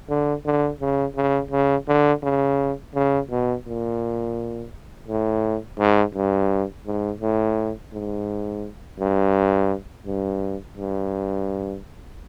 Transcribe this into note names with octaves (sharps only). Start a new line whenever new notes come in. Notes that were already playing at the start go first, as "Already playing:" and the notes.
D3
D3
C#3
C#3
C#3
D3
C#3
C#3
B2
A#2
A2
G#2
G2
G#2
A2
G#2
G2
G2
G2